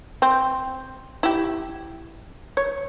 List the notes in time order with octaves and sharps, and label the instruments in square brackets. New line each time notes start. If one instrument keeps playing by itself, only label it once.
[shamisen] C4
E4 G4
C#5